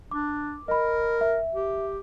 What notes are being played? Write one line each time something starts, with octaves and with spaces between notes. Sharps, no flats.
D4 D6
A#4 D#5 B5
E5
G4